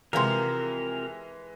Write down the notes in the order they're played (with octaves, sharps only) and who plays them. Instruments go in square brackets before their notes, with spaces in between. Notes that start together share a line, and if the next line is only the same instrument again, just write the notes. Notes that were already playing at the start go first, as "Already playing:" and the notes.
[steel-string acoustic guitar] C3 F3 [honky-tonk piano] E3 G#3 [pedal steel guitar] A#4 [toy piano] C#5 F5 C6